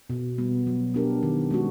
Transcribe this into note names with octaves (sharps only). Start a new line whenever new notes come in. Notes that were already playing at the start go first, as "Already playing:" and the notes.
B2
G3 B3
F#3
B3 D4 G4 A#4
D#3
G#3 C#4 F#4